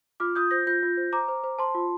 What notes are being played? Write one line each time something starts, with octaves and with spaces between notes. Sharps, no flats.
F4 D6 F6
F4 D#6 G6
C5 G6 A#6
F4 G6 A#6
F4
C5
C5 A#5 D6
C5
C5
C5 A5 C6
F4